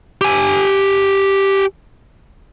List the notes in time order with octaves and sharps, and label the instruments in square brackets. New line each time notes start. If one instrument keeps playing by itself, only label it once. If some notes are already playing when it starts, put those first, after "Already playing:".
[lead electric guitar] G4 G#5